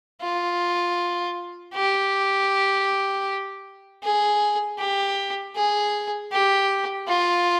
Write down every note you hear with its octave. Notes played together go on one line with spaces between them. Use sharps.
F4
G4
G#4
G4
G#4
G4
F4